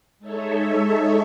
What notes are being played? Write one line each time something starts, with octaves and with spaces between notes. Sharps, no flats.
G#3 D#4 A4 C#5 E5